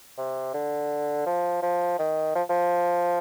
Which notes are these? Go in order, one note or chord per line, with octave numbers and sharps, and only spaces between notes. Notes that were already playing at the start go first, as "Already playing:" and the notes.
C3
D3
F3
F3
D#3
F3
F3